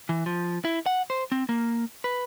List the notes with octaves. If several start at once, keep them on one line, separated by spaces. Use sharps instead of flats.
E3
F3
E4
F#5
C5
C4
A#3
B4